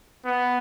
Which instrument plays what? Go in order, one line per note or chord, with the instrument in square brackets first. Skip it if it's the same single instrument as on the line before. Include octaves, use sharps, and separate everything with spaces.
[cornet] B3